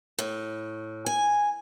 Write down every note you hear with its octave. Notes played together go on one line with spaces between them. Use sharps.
A2
G#5